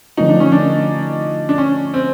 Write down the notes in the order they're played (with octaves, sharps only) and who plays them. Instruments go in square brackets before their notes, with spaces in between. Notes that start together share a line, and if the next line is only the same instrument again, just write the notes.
[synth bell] D3 F3 A3 C4 F4 [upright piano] D#4
[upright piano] D4
C#4
D4
D4
C#4
C4